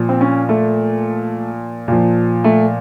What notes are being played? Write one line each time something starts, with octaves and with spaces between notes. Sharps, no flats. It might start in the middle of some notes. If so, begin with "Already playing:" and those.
Already playing: A#2 F3
C4
C#4
A3
A#2 F3
A3